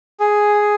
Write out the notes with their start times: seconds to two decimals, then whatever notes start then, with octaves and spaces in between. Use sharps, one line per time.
0.20 G#4